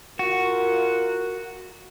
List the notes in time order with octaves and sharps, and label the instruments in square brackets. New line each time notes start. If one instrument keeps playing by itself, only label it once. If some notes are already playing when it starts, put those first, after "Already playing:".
[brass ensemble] F4 A#4 F#5 [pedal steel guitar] F#4